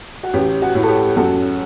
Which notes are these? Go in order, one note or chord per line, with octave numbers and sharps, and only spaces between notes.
F#4
A1 G4
F#4
A2
A4
G4
F#2 F#4 A4